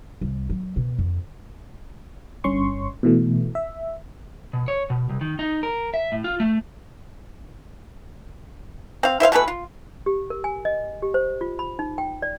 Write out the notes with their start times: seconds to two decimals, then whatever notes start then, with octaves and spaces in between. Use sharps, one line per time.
0.21 C2
0.50 F#3
0.76 B2
0.99 F2
2.44 G1 G2 C#4 C6 C#6
3.03 B2 E3 A3
3.55 E5
4.53 B2
4.68 C#5
4.90 B2
5.09 C2
5.21 D#3
5.39 D#4
5.63 A#4
5.94 E5
6.12 A2
6.24 F4
6.40 A3
9.03 C4 F5
9.20 E4 C5 E5 F5
9.32 B2 E3 A3 B4
9.48 F4
10.06 G4
10.30 A#4
10.44 G#5
10.65 D#5
11.02 G4
11.14 C5
11.41 F4
11.59 B5
11.79 D#4
11.98 G5
12.22 D5